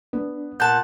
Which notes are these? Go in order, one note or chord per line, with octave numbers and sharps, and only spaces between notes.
B3 D4
A#2 F#5 A5 G6